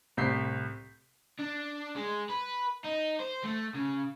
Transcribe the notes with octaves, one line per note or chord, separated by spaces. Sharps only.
C2 A2 C4 G6 B6 C7
D4
G#3
B4
D#4
C5
A3
C#3